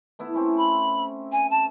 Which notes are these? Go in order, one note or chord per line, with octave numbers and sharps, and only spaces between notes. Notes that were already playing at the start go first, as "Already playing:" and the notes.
A3 B3 E4
C4 C#4 E4
B5
G#5
A5